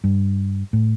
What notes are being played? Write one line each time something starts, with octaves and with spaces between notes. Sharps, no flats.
G2
A2